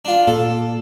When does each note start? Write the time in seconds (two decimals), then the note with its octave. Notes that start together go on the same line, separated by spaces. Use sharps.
0.05 D4 F4
0.27 A#2 A4